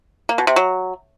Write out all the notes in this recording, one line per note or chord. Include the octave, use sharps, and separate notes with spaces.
A#3
B2
C3
F#3